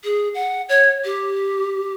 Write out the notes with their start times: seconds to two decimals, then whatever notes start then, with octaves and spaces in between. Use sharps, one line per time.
0.04 G#4
0.34 F#5
0.69 C#5
1.04 G4